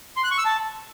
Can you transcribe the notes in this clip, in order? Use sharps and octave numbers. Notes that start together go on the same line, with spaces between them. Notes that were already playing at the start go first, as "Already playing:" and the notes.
C6
F#6
C#6
E6
A5